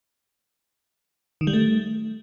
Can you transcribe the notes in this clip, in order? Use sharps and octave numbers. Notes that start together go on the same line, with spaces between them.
D#3
G3
A3